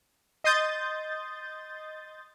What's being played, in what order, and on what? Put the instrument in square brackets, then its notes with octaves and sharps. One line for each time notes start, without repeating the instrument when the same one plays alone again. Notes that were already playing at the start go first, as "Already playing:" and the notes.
[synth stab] D#5 C6 D#6 G6 A6